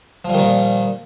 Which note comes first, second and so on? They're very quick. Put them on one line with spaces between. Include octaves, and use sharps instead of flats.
F3 G3 D#3 A#2